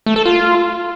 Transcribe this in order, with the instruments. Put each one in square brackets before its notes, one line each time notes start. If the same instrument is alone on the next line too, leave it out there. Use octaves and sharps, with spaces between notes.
[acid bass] A3
A4
F4